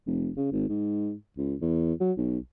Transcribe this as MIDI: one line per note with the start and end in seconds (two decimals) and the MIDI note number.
0.06 0.30 29
0.36 0.47 49
0.52 0.65 32
0.69 1.13 44
1.37 1.55 37
1.61 1.93 40
2.00 2.12 54
2.17 2.38 35